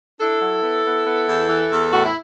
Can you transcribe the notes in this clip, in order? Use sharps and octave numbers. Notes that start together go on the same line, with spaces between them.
D4 E4 A4
F#3
B3
B3
B3
E2
E3
E2
A2 F#4
E4